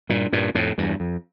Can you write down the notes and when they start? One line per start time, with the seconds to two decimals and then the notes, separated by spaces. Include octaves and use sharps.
0.09 G2 A#2
0.33 G2 A#2
0.55 F2 A2
0.78 E2 G2
1.00 F2